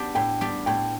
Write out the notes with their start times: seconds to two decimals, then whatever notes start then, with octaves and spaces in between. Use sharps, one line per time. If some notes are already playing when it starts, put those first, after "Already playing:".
Already playing: B3 D4 G4
0.15 A2 G5
0.41 G3 B3 D4 G4
0.66 A2 G5